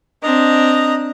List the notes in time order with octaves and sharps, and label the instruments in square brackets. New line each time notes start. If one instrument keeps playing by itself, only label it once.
[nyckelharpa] C4 D4 [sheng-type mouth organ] D#5 A#5